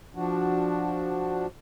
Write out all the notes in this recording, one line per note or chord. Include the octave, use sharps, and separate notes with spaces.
F3 D4 F#4